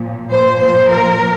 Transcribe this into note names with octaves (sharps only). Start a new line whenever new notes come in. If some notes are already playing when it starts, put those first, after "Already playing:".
Already playing: A#2 F3
A#2 F3 C5
C5
A#4